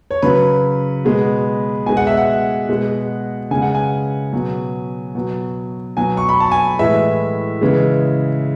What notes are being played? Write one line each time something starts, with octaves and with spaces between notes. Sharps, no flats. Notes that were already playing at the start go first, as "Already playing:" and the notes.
C#5
C#3 F#3 B4
B2 G#3
B2 G#3 G#5
F#5
E5
F#5
B2 G#3
C#3 G#3 G#5
F#5
G#5
B2 F#3
B2 F#3
B2 F#3 G#5
C#6
B5
A5
G#5
A2 E3 G#3 E5
C#3 E3 G#3